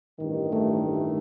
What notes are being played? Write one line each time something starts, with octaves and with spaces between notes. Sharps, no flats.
A1 G2 D#3
A3
A3